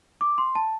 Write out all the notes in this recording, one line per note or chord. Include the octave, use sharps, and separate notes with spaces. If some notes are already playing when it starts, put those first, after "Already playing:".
D6
C6
A5